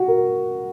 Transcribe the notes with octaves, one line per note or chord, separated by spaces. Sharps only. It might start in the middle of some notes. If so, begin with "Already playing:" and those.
Already playing: F#4
A#4